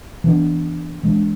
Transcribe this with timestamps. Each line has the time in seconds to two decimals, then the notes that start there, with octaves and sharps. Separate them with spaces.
0.24 E3 B3 D4
1.03 E3 G#3 B3 D4